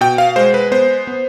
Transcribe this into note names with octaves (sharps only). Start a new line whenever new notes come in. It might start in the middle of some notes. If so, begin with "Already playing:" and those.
B2 G5
F5
G#3 C5
B4
B3 C5
B3